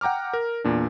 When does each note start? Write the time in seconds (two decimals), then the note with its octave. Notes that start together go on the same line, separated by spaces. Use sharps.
0.01 F#5 G5 A#5 D6 F6
0.33 A#4
0.64 E2 A#2 D4